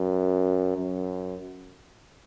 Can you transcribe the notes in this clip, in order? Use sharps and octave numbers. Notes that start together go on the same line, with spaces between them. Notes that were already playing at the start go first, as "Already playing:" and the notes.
Already playing: F#2
F#2